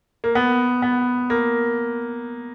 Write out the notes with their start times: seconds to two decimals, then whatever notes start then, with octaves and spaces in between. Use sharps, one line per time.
0.24 A#3
0.35 B3
0.82 B3
1.30 A#3